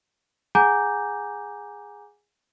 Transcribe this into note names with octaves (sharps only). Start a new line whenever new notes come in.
G#4 F#5 G#5 A#5 D6 G6